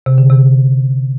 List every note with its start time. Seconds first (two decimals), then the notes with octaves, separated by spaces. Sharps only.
0.06 C3
0.18 D3
0.30 C3